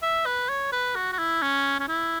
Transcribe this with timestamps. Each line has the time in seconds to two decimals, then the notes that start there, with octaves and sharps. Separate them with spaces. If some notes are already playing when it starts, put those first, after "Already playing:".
0.02 E5
0.26 B4
0.49 C#5
0.72 B4
0.95 F#4
1.12 F#4
1.18 E4
1.42 C#4
1.79 C#4
1.88 E4